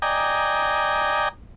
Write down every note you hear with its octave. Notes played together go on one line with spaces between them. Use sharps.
D5 D#5 G5 G#5 A#5